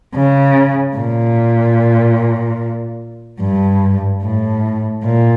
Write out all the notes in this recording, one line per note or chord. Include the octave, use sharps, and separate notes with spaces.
C#3
A#2
G2
A2
A#2